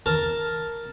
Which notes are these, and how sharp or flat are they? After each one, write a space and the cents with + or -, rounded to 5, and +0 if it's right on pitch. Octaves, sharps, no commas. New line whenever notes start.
A#4 +0 A5 +0